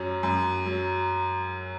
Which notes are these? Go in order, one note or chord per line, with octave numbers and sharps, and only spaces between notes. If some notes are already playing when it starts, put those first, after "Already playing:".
Already playing: F#2 F#3 C#4
F#2
F#3